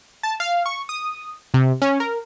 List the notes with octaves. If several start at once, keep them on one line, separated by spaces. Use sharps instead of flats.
A5
F5
C#6
D#6
C3
C#4
A#4